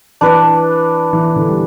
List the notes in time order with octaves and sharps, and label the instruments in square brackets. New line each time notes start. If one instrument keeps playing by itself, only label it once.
[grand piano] E3 [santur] D4 B4 D5
[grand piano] E3
D3
G3